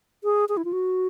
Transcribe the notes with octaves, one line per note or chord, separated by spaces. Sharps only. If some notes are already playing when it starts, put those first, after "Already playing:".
G#4
G#4
E4
F4
F#4